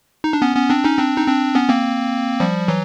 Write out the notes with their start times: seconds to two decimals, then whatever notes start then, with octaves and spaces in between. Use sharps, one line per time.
0.24 D#4
0.33 D4
0.42 B3 C#4
0.56 B3 C#4
0.70 C4 D4
0.84 C#4 D#4
0.99 C4 D4
1.18 D#4
1.27 C4 D4
1.55 B3 C#4
1.70 A#3 C4
2.40 F3 G3
2.68 E3 F#3